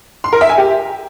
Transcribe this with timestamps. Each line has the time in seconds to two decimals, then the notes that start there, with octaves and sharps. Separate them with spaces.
0.24 C6
0.33 A#4
0.41 E5
0.49 G#5
0.58 G4